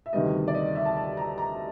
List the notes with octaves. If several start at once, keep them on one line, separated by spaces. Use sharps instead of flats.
E5
D2 C3 D#3 G3 B3 D#5
D5
D#5
E5
A5
A5
A#5
A#5